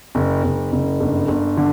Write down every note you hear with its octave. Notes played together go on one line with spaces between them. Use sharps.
F#1
F#1
F#1
G1
G1
D3